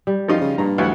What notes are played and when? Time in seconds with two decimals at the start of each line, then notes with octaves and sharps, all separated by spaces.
0.07 G3
0.28 F#2 F3 D#4 F4
0.41 C#3
0.58 G2 A#2 A#5
0.78 D2 E3 F#3 F#5